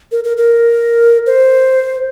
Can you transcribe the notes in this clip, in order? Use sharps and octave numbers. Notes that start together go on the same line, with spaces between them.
A#4
A#4
A#4
C5